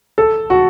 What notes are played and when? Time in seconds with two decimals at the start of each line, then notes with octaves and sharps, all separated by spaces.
0.18 A4
0.50 F#4